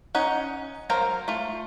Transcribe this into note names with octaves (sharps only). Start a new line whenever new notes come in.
C#4 D#4 F#5
F#3 A#4 C5 F5 A#5
A3 F4